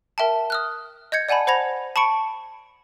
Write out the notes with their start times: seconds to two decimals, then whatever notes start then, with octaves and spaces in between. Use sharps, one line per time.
0.18 A#4 E5 G5 A5
0.50 D#6 F6 F#6
1.12 D#5 G6 G#6 C#7
1.29 D5 F#5 G#5 A5 B5
1.47 C5 F#5 B5 G#6 A#6 F7
1.96 A5 B5 C#6 C#7 D7